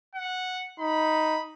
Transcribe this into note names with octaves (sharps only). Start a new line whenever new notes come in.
F#5
D#4 B5